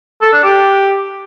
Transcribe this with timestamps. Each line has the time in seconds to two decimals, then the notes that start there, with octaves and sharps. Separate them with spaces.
0.22 A4
0.33 D4
0.44 G4